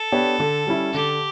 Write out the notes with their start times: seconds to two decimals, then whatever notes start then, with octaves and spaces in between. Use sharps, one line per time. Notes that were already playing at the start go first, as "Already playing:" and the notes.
Already playing: A4
0.12 B3 D4 G4 C#5
0.40 D3
0.67 G3 C#4 E4
0.93 D3 G4